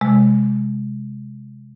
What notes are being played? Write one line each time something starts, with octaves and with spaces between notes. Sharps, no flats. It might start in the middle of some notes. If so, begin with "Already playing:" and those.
C3 G#3